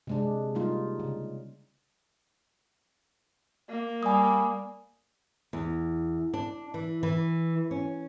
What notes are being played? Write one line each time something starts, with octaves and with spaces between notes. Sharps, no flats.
C3 G#3 D4
G3 A#3 D#4 F4
C#3
A#3
G3 G#5 D#6
E2
D4
E3
E3
C#4